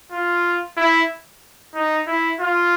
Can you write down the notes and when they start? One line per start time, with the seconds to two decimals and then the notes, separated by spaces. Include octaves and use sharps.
0.12 F4
0.77 E4
1.75 D#4
2.07 E4
2.40 F4